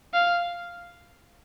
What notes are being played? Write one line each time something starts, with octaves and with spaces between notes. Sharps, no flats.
F5